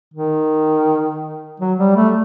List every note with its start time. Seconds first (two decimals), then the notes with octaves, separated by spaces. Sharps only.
0.14 D#3
1.60 F#3
1.79 G3
1.96 A3